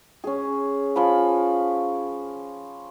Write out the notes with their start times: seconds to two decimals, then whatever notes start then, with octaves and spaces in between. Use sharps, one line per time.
0.24 C#4 G#4
0.96 F3 G#5 B5